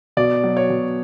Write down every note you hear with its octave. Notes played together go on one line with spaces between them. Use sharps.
B2 D5
F#3
C#5
B2